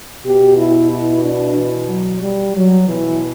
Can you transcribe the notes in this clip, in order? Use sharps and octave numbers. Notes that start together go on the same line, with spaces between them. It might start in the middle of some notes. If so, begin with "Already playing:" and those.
B2 G4
E4
E4
D4
E3
F#3
G3
F#3
B2 E3